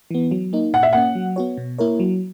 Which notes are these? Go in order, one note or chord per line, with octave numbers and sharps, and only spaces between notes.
E3 B3
F#3
A#3 D#4
A#2 F#5
E5
A#3 C#4 F#5
F#3
B3 F#4 C#5
B2
A#3 E4 A#4 C#5
F#3